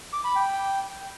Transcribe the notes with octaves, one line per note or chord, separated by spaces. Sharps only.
D6
B5
G5